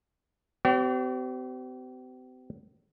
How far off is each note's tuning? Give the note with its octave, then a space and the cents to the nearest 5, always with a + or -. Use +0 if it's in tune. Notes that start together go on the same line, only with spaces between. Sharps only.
C4 -45 G4 -40 C#5 +35